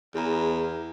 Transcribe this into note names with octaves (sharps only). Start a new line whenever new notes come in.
E2 G#4 A#5